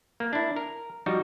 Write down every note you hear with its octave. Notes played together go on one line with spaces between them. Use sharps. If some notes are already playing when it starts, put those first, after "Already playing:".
A#3
D4 E4
A#4
F3 G3 D#4 F#4